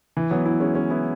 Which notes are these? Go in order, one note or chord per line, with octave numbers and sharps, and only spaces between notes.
E3
F#3 B3
B3 E4
G#3 C#4
G#3 C#4
B3 E4